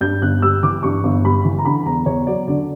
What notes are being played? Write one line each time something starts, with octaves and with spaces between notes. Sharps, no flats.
G2 G6
G1 F#6
G3 E6
E3 D6
G2 C#6
G1
G3 B5
E3
A#5
D3 B5
E2 A#5
E2 C#5
F#3 D5
D3 D5